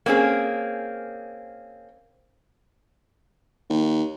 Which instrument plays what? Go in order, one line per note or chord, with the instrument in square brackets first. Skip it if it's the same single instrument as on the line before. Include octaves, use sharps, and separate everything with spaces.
[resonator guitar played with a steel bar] A#3 C4 C#4 G#4
[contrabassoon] D#2